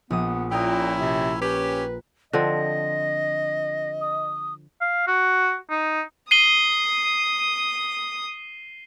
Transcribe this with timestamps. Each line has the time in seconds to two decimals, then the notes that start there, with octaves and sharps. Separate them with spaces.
0.10 A#1 B3 D#6
0.51 A#2 C#4 E4 G5 A#5 D#6
1.00 C3
1.41 C#4 G4 B4
2.33 D3 F3 C4 D#5 A#6
4.01 D#6
4.81 F5
5.07 F#4
5.70 D#4
6.31 D#6 C7 D#7 G7